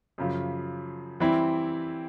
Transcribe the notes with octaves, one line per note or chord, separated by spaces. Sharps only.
F#2 C#3 F3
E3 G3 C4 E4